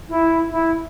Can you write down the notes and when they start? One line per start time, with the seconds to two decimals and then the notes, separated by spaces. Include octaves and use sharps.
0.09 E4
0.51 E4